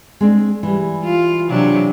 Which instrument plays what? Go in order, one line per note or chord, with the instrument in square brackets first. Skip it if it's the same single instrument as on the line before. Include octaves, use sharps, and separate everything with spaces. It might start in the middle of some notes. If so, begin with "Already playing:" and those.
[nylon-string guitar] G#3 C4 D4
E3 G3
[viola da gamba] F4
C3 F#3 D4